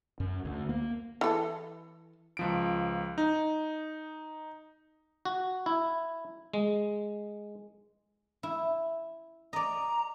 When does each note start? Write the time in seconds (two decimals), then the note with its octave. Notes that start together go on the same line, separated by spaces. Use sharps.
0.20 F#2
0.45 D2
0.69 A#3
1.21 E3 A4
2.37 C#2 F3 D7
3.18 D#4
5.25 F#4
5.66 E4
6.54 G#3
8.43 E4
9.53 D5 D#5 A#5